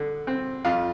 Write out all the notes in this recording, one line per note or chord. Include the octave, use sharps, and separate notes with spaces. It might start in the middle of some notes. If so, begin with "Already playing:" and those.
Already playing: D3
C4
F2 F4